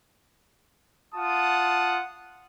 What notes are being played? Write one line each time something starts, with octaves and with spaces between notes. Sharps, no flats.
F4 F#5 A5 D#6